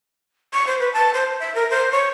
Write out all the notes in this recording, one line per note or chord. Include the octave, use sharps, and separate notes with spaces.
C#6
C5
B4
A5
C5
E5
A#4
C5
C#5